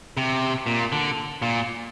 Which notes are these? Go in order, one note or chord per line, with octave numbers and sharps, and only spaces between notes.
C3
A#2
D3
A#2